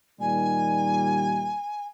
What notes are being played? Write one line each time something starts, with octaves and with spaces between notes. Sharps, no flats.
A#2 D#3 G3 G#5